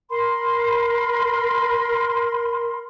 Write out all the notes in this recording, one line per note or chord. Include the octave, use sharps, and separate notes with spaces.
A#4 B5 C6